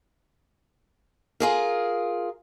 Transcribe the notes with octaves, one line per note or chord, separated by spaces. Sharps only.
F4 G#4 A#4